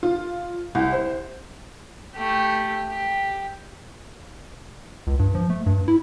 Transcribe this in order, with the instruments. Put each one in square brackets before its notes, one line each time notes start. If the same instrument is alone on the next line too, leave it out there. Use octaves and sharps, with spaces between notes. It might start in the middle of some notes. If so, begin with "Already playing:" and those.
[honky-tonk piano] F4
C2
C5
[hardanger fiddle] A3 G4
G4
[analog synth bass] C#2
G2
F3
A3
G2
E4